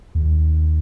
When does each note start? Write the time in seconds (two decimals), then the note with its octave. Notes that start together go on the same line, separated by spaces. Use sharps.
0.15 D#2